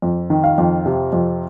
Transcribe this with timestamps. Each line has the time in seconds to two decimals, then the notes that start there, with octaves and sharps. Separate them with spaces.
0.02 F2
0.30 D#3
0.44 F5
0.58 F2
0.86 C3
1.13 F2